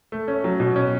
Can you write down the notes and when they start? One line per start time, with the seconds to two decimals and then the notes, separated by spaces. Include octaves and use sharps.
0.12 A3
0.28 C#4
0.44 F#3
0.60 B2
0.76 C#4